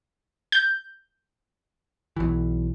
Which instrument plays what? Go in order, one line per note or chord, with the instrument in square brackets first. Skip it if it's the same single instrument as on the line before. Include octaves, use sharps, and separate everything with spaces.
[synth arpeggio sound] G6
[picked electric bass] B1 E3